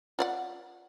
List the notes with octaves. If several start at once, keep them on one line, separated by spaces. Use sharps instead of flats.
F4 D5 F#5